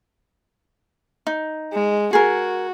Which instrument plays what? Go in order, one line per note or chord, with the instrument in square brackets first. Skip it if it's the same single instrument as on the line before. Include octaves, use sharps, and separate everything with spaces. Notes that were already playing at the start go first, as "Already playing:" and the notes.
[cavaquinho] D#4
[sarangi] G#3
[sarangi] F#4 [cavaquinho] G#4 A#4